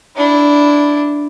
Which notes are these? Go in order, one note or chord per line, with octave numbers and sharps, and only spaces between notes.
D4 E4